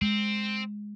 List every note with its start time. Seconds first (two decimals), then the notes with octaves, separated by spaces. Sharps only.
0.02 G#3 C4